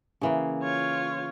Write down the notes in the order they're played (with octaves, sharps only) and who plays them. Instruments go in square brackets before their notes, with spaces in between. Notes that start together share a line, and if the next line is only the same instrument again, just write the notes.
[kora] C#3 E3 A#3
[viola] F4 C#5